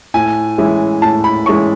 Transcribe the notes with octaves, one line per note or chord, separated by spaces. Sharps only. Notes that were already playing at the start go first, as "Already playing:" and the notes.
A2 G#5
E3 G#3 C#4 E4
A2 A5
B5
E3 G#3 C#4 E4 C#6